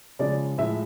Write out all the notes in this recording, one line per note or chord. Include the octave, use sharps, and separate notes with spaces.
C#3 F3 G#3 D5
A2 F3 G#3 E5